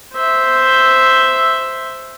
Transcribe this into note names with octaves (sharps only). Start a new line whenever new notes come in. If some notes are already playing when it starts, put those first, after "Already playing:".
C5 E5